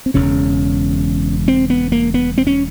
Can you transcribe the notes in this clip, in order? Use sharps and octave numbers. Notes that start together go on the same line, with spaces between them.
C4
E1 E2 C#3 C#4
C4
B3
A#3
B3
C4
C#4